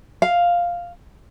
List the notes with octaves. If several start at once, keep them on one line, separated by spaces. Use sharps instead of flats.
F5